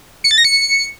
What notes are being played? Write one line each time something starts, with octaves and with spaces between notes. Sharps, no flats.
C#7
A6
A#6
C#7